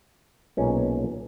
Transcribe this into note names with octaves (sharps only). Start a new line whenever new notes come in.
B1 A#2 G#3 C#4